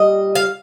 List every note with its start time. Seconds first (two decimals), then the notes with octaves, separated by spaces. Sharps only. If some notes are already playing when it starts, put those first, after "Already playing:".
Already playing: A#2 G3 D#5
0.35 F5